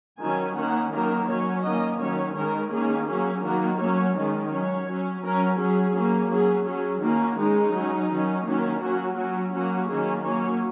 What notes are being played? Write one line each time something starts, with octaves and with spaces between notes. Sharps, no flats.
D#3 F#3 C#4 G#5
D#3 A#3 C#4 F#5
D#3 F#3 A#3 C#4 A#4
F#3 C#4 C#5
D#3 A#3 C#4 D#5
D#3 F#3 C#4 C#5
D#3 G#3 C#4 A#4
D#3 A#3 C#4 G#4
F#3 A#3 C#4 G#4
D#3 F#3 A#3 F#4
F#3 A#3 C#4 C#5
D#3 G#3 C#4
F#3 C#4 C#5
F#3 C#4
F#3 C#4 A#4
F#3 C#4 G#4
F#3 A#3 C#4
F#3 C#4 G#4
F#3 C#4 G#4
D#3 A#3 C#4 F#4
D#3 G#3 C#4 D#4
F#3 C#4
D#3 F#3 C#4
D#3 F#3 A#3 C#4
F#3 A#3 C#4 F#4
F#3 C#4 F#4
F#3 A#3 C#4 F#4
D#3 F#3 A#3 C#4 G#4
F#3 A#3 C#4 C#5